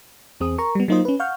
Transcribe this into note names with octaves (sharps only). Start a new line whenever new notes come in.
E2 C4 G#4 D#6
A#4 A#5 C#6
G3 B3
F#3 A#3 D#4 F4 C5 D#5
C#4 B4
F5 F#5 C#6 F6 G6